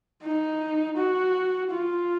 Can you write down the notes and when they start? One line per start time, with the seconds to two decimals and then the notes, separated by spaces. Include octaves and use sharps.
0.23 D#4
0.96 F#4
1.71 F4